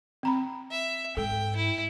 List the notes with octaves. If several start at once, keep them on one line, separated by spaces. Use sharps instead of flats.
C4 A#5 B5
E5
G#2 A4 G5
E4